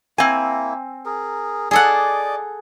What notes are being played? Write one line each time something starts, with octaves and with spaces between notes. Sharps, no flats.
A#3 C4 E4 G#5
G#4 A#4
G#4 A4 D5 D#5 F#5 D6